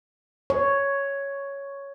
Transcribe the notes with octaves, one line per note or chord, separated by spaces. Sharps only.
C#5